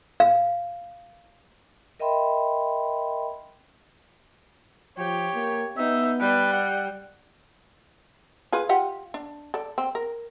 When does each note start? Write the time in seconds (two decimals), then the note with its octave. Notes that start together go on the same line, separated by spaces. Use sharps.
0.20 F5
2.00 A#4 D#5 E5 G5 B5 C6
4.98 F3 G4 C#5
5.34 A#3
5.77 B3 D#4 E5
6.21 G3 B4
6.53 F#5
8.52 F4 G#4 B4
8.69 F4 G4 F#5
9.14 D4
9.54 A4 D5
9.78 C4
9.95 A#4